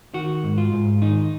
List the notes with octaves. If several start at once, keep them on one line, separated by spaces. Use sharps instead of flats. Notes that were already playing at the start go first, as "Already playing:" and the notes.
D#3 F#4
G#2
F4
G#2
D#3 D#4